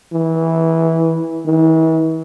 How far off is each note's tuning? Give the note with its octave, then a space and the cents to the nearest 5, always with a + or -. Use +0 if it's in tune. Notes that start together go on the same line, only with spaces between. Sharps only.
E3 -15
E3 -40